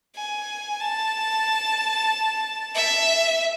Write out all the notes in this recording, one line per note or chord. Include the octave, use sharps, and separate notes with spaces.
G#5
A5
E5